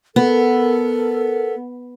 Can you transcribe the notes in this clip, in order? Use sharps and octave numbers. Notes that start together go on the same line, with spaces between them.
B3 A4 A#4